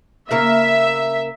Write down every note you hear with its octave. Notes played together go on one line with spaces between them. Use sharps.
C#3 A#3 E5 F5